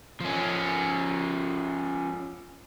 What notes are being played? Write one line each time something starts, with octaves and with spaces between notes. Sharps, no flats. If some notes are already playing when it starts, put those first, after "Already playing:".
F3 C#4